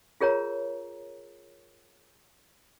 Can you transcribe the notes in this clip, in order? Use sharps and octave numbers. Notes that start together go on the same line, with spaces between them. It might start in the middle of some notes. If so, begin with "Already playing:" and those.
F4 G#4 A#4 C#5 A#5